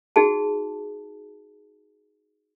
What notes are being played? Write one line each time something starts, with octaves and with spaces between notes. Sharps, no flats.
D#4 F#4 G#4 A5